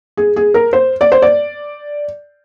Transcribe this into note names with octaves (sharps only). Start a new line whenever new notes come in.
G#4
G#4
A#4
C5
D5
C5
D5